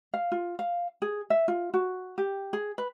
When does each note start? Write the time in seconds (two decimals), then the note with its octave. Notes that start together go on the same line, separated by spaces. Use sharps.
0.14 F5
0.32 F4
0.59 F5
1.02 G#4
1.30 E5
1.48 F4
1.74 F#4
2.18 G4
2.53 G#4
2.78 B4